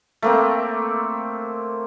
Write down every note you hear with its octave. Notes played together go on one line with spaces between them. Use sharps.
A3 A#3 C4